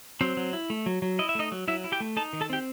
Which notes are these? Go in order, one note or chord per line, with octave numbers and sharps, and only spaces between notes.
F#3 C4 C5
F#3
E4
A3
F#3
F#3
E4 D#5
E5
A3 D#4 D#5
F#3
F#3 E4 E5
E4
G4 G5
A3
D#4 A4 A5
D#3
A4 A5
C4 G4 G5